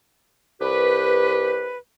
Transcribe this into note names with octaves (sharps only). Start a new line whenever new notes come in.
C2 G4 B4